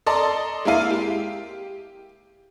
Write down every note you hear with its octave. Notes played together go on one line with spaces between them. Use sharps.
A4 D5 D#5 A5 A#5 C6
G#3 A#3 E4 F5 D#7
G4